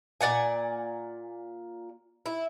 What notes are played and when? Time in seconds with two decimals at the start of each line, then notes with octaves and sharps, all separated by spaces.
0.21 A#2 D5 F#5 G#5
2.26 E4